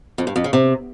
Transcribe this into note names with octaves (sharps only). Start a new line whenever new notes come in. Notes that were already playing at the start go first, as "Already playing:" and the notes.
F2
G2
F2
C#3
C3